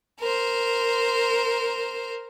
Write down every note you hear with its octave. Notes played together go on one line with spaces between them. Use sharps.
A#4 C5